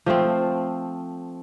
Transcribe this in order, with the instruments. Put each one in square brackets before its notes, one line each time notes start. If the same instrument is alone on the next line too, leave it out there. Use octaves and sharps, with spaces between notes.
[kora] F3 A3 C4